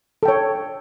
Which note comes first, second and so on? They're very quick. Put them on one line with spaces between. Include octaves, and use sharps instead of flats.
A4 G5 C#5